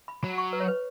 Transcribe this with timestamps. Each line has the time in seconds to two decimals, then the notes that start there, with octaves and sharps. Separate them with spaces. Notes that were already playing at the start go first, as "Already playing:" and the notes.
0.08 B5
0.23 F#3 B5
0.38 C#6
0.53 B4
0.60 C#5
0.68 B4